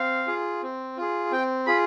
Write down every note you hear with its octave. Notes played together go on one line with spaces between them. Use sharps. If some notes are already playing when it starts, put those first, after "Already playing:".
Already playing: C4 F5
F4 G#4
C4
F4 G#4
C4 G5
F4 G#4 B5